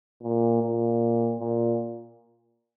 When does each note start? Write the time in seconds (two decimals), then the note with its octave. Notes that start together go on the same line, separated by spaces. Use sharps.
0.23 A#2
0.62 A#2
1.39 A#2